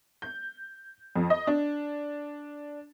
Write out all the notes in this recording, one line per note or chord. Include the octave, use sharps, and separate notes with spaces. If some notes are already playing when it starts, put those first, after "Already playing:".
G6
F2
D#5
D4